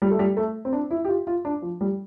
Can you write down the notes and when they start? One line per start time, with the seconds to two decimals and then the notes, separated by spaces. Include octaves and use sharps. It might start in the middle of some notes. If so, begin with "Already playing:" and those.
0.02 G3
0.11 A3
0.19 G3
0.37 A3
0.65 C4
0.73 D4
0.91 E4
1.05 G4
1.08 F4
1.27 F4
1.45 D4
1.62 F3
1.81 G3